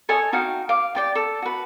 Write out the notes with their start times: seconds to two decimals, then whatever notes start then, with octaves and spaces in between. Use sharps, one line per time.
0.09 A4 C#5 D#5 G#5
0.33 D#4 F#4 F5 G5
0.69 F5 D6
0.95 G4 D5 G5
1.15 A4
1.42 F#4 B4